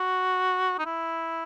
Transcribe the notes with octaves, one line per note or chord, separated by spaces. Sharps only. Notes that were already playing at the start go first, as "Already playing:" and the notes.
Already playing: F#4
D#4
E4